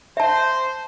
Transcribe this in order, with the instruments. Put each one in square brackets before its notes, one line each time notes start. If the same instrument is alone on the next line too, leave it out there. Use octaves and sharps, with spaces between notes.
[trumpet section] C5 [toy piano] E5 A5